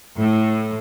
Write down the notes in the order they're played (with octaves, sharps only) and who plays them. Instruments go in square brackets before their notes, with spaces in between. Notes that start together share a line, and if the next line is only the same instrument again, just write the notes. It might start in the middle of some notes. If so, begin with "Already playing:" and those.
[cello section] A2